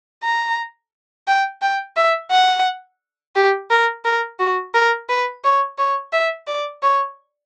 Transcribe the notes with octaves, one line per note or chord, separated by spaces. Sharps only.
A#5
G5
G5
E5
F#5
G4
A#4
A#4
F#4
A#4
B4
C#5
C#5
E5
D5
C#5